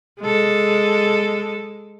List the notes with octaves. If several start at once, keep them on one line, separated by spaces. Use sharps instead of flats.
G#3 A4